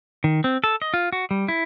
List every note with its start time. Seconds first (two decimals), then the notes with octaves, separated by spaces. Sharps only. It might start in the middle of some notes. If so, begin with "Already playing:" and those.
0.24 D#3
0.44 C4
0.64 A4
0.82 D#5
0.94 F4
1.13 F#4
1.31 G3
1.48 E4